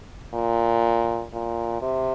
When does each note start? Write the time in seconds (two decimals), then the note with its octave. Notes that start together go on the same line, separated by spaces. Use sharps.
0.33 A#2
1.32 A#2
1.82 C3